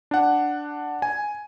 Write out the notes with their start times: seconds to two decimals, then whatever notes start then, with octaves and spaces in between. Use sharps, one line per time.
0.11 D4 F#5
1.02 G#5